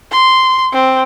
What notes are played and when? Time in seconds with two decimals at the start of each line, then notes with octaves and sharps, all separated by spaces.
0.11 C6
0.72 C4